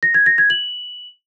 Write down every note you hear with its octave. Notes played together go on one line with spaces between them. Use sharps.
A#6
G#6
A#6
G#6
F#7